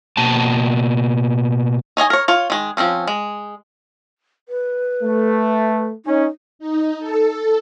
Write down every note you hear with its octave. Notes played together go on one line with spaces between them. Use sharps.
B2 A#3 A5
D#4 C#5 D#5 G#5
A#4 C#5
F4 C#5
D#3 G#3
F3 F#3 C4 C#4
G#3
B4
A3
C#4 D#4
D#4
A4